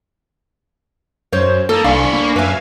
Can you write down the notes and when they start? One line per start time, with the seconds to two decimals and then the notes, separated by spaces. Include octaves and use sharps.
1.33 F#2 C5 C#5
1.69 A#3 A4 A5 A#5 D#6
1.84 C2 D4 D5 F5 G#5 B5 C#6
2.13 A#3
2.36 F#2 B4 E5 F5 G#5